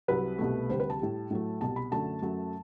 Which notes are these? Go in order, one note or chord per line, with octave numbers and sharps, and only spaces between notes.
C2 C3 F#3 B4
C2 B2 A3
D2 C3 G3 C5
B4
A5
A2 G3
A2 F#3 A3
C2 B2 G3 A5
B5
F#2 D3 F#3 A3 A5
F#2 F#3 A3